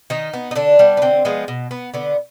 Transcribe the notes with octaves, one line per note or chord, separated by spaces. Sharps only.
D#3 D#4
B3
D#4
D3 D4
G3 B3
B3
D3 C4
F3 G#3 B3
B2
B3
D3 B3